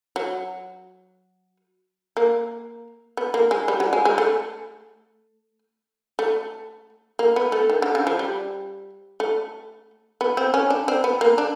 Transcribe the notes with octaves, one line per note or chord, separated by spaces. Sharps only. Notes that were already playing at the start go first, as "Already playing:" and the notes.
F#3
A#3
B3
A#3
G#3
G3
F#3
G#3
G#3
A3
A3
A#3
B3
A3
D#3
D3
C#3
F3
G3
A3
B3
C4
C#4
D4
C4
B3
A#3
D4